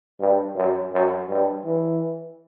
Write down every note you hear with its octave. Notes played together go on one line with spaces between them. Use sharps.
G2
F#2
F#2
G2
E3